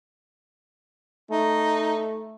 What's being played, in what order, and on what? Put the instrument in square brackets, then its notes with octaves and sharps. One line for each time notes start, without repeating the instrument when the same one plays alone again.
[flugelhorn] A3 [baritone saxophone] D#4